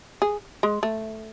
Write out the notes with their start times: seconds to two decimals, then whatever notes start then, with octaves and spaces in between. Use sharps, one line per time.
0.22 G#4
0.63 G#3
0.83 A3